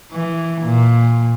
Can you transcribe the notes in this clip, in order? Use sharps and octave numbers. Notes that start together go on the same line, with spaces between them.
E3
A#2